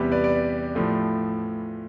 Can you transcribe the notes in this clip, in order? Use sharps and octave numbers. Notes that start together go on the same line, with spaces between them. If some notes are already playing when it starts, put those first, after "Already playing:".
Already playing: E2 C3 G3 B3 G4 B4
B4 D5
B4 D5
A2 F3 A3